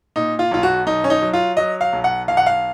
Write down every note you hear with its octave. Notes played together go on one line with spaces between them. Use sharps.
A#2 D#4
F4
B1 F4
F#4
B1 D#4
C#4
D#4
F#3
F4
F#3 D#5
F5
B1
F#5
B1 F5
F#5
F5